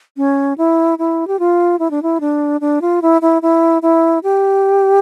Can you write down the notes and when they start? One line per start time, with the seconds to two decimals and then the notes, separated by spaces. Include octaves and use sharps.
0.17 C#4
0.58 E4
0.99 E4
1.28 G4
1.39 F4
1.79 E4
1.91 D4
2.03 E4
2.21 D4
2.61 D4
2.82 F4
3.02 E4
3.22 E4
3.42 E4
3.82 E4
4.23 G4